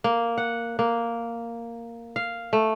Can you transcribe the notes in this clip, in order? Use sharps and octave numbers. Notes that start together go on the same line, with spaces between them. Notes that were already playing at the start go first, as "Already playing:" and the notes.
A#3
F#5
A#3
F5
A3